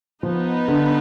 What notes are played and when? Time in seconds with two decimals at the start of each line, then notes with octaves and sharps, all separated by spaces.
0.23 F3 B3 D#4 B4
0.68 D3